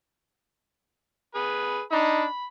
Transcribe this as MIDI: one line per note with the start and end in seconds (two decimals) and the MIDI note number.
1.35 1.80 68
1.35 1.80 71
1.91 2.26 62
1.91 2.26 63
1.91 2.45 83